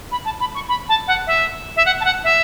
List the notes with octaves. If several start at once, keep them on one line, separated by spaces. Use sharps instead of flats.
B5
A5
B5
C#6
B5
A5
F#5
E5
E5
F#5
A5
F#5
E5